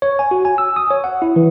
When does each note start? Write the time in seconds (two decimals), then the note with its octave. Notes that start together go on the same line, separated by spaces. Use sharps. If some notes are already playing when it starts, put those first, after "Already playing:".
0.02 C#5
0.19 G#5
0.31 F#4
0.45 G#5
0.58 E6
0.76 D#6
0.91 C#5
1.04 F#5
1.22 E4
1.36 E3